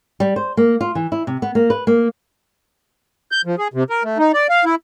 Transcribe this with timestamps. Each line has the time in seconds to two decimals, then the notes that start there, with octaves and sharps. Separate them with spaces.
0.20 G3
0.36 C5
0.57 A#3
0.81 F4
0.95 E3
1.12 E4
1.27 C3
1.42 B3
1.55 A#3
1.70 B4
1.87 A#3
3.32 G6
3.45 F3
3.58 G#4
3.74 C3
3.90 A#4
4.04 A3
4.18 D#4
4.34 D5
4.49 F5
4.65 E4